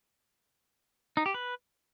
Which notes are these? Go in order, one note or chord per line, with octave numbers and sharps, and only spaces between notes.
D#4
G4
B4